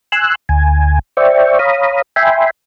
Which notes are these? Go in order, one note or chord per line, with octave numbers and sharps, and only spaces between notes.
G#5 C6 E6 F#6
D2 G#5
C5 D5 E5 G5 C#6
C#5 F5 A#5 B5 D#6
E5 G5 G#5 B5 C6